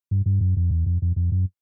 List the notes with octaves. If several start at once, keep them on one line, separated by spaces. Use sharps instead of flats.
G2
G2
F#2
F2
E2
F2
F2
F2
F#2